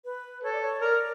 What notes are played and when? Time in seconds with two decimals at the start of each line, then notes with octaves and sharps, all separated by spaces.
0.05 B4
0.43 A4 C#5
0.53 D5
0.62 C#5
0.82 A#4 D5